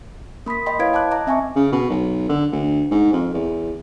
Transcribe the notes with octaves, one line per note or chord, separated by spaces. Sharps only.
A#3 B5 D#6 B6
D#5 G5 B5 C6
E4 B4 C#5 F5 G#6 D7
G5 A5 D6 F#6
D#5 A#5 D6
C4 E5 G#5 A5 C#6
C#3
B2
B1
D3
D2
G#2
F2
E2